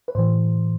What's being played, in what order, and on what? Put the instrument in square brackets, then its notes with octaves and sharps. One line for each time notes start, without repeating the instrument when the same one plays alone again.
[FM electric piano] B4
A2 E3 C5